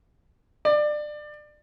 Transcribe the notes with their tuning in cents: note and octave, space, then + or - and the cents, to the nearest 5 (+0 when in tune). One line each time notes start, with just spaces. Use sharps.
D5 +25